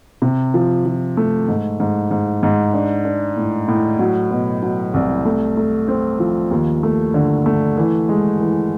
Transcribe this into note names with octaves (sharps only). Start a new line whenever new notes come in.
C3
F3
F3
A3
G#2
G#2
G#2
G#2
D4
D4
A2
A2
F#3
B2
F#3
C2
A3
A3
C4
F3
D#2
A3
D3
A3
E3
G#3
E3